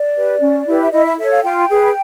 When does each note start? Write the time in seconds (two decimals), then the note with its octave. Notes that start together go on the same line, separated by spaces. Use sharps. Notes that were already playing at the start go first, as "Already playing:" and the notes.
Already playing: D5
0.15 G4 B4
0.41 C#4
0.66 E4 G4 B4
0.81 E5
0.92 E4 D#5
1.05 E5
1.18 A4 C#5 E5
1.31 F5
1.43 F4 G5
1.69 G#4 B4